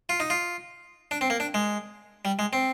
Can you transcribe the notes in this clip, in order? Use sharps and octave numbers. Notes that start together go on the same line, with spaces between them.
F4
D#4
F4
D4
C4
A#3
D4
G#3
G3
G#3
C4